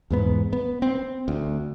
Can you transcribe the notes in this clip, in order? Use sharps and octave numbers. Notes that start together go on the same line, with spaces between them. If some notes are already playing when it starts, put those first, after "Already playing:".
E2 G#2 B3
B3
C4
D2